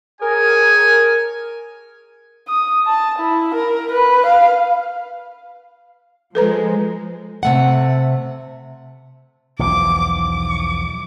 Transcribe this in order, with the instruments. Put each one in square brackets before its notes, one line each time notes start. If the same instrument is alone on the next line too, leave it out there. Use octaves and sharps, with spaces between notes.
[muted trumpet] G#4 [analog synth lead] A#4 [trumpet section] C#5 G#5
[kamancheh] D#6
A5
E4
A#4
B4
F5
[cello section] F3 G#3 [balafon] A4 B4 A#5
[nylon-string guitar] C3 A3 F#5
[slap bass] B1 E2 F3 [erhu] D6
[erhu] D6